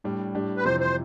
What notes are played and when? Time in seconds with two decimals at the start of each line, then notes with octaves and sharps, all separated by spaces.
0.04 A2 G3 D4
0.35 A2 G3 D4 G4
0.57 B4
0.64 F2 C3 E3 C5
0.80 C5